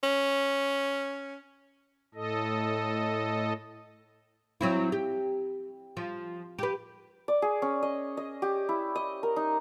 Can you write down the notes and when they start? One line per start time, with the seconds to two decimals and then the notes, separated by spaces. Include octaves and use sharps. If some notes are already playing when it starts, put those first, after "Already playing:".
0.03 C#4
2.15 A2 A4 D#5
4.61 F#3 C4 E4
4.92 G4
5.97 F3
6.59 G4 B4
7.28 D5
7.42 G#4
7.62 C#4
7.82 D#5
8.17 D#5
8.42 G4
8.69 E4
8.95 D#5
9.23 A#4
9.36 D#4